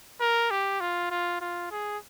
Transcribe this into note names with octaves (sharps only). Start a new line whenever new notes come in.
A#4
G4
F4
F4
F4
G#4